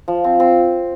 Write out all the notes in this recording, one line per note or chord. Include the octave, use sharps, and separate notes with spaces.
F3
C4
C4